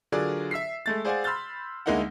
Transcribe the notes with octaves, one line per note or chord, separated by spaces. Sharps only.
D3 F#3 F4 G#4 A#4 D5
E5 E6 B6 C7
G#3 A3 A6
G#4 C5 D5 F5 F#5 G#5
B5 C6 E6 F6 G6 A6
D2 G#3 A#3 D#4 E4 F#5